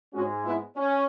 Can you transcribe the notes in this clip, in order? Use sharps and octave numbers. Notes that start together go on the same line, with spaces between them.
G#2 G#3 C#4 F#4
B3 E4
C#4